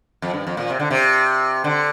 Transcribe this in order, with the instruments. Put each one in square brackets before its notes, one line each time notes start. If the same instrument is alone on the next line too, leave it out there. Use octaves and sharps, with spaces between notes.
[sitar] F2
G2
F2
A#2
C3
D3
C3
D3